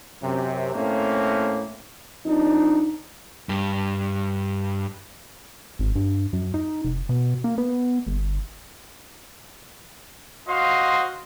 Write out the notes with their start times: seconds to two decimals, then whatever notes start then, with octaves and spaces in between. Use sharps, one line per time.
0.22 F#2 C3
0.74 A2 A3 A#3 C4 C#4
2.25 F2 D4 D#4
3.49 G2
5.79 G#1
5.96 G2
6.33 F#2
6.54 D#4
6.84 F1
7.09 B2
7.44 A#3
7.58 B3
8.06 G1
10.48 F#4 C5 D#5 F5 C6